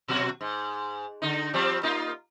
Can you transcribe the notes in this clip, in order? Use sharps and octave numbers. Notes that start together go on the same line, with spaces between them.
B2 F#3 F#4
G#2
D3 D#4
F3 G3 C4
A#3 D#4 F4